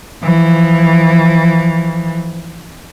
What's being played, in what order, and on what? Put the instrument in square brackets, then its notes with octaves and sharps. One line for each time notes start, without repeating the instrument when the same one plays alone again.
[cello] E3 F3